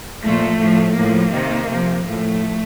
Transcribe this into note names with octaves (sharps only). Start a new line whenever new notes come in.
A#2 F3 A3
A2 F3
A2 F3 A#3
C3 D#3
C3 F3
A2 F3 A3